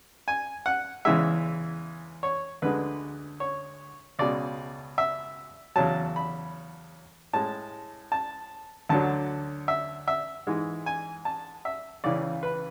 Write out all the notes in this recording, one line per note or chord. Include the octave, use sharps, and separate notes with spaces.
G#5
F#5
E2 C#3 E3 G#3 E5
C#5
D2 D3 G#3 B4
C#5
C#2 B2 G#3 D5
E5
E2 C#3 F#3 A5
B5
A2 G#3 A5
A5
D2 D3 F#3 A5
E5
E5
G#2 E3 G#3
G#5
A5
E5
C#2 C#3 E3 D5
B4